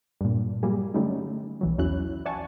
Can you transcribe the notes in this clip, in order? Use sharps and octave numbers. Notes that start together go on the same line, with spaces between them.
G2 A#2
F#3 G3 A#3 G#4
D3 F#3 G3 A3 C#4 D#4
B1 E3 F#3
E2 F#3 C#4 E4 F#4 F#6
D5 E5 F#5 G#5 A5 C#6